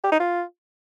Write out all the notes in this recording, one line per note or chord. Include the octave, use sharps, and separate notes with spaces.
G4
D#4
F4